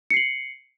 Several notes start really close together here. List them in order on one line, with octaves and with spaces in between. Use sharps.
C#7 C7 F#7